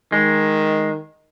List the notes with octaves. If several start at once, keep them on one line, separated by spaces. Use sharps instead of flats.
D#3 G#3